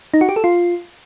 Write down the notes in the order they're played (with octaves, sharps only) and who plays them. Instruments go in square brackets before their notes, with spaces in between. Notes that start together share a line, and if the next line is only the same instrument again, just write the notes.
[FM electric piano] D#4
F#4
G4
A4
F4